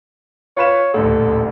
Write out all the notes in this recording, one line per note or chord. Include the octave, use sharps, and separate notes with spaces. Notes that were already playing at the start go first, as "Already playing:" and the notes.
F4 B4 C#5 E7
D#1 A1 D2 A4